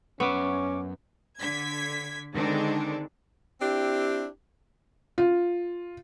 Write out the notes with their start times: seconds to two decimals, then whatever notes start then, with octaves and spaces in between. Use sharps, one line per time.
0.20 F#2 B3 C#4 E5 C#6 D6
1.40 D3 G#6 B6
2.33 D3 D#3 G#3 C4 D4
3.61 C4 D4 E4 G4
5.18 F4